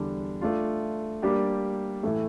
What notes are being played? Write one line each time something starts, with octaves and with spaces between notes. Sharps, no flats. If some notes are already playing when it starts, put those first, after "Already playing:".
Already playing: E2 D3 G3 D4
A3 D4 F4
G3 A#3 D4 G4
A2 E3 A3